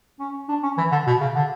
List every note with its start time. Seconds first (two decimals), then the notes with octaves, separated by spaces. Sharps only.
0.20 C#4
0.49 D4
0.63 C#4
0.78 E3
0.91 D3
1.07 B2
1.21 C#3
1.35 D3